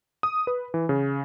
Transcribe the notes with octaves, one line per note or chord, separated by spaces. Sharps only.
D#6
B4
E3
C#3